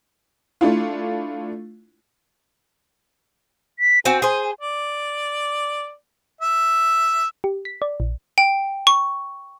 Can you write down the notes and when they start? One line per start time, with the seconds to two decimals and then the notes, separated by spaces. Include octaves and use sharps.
0.61 A3 D4 E4 F4
3.79 B6
4.05 C4 F#4 G#5
4.22 G#4 C5 G#5
4.61 D5
6.41 E5
7.44 G4
7.65 B6
7.82 D5
8.00 A#1
8.38 G5
8.87 C#6